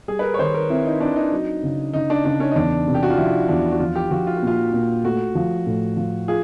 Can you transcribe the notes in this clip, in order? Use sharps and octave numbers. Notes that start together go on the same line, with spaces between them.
G3 G#4
B4
A#4
C#5
D#3 C5
A#4
C4 E4
D#4
C4 D4
D#4
F#3
C#3
C#3 D#4
D4
C#3 D4
C#4
D#4
E2 D4
C3
G4
F#4
F4
F3 E4
E2 D4
F#4
F3 F4
G4
F3 F#4
F4
F#4
A#2 F4
A#2
A3 F#4
F3
A2
F3
F4 G#4